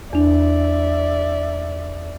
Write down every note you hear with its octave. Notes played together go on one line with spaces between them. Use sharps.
E2 D4 D5 E5